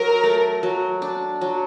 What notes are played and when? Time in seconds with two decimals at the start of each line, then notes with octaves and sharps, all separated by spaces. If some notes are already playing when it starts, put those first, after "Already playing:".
Already playing: F#3 A#4
0.24 A3
0.63 F#3
1.02 D4
1.41 F#3